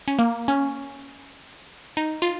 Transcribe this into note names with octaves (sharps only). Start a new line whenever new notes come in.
C#4
A#3
C#4
D#4
F4